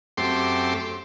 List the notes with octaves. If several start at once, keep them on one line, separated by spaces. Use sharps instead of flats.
F#2 A3 C4 G4 C6 D6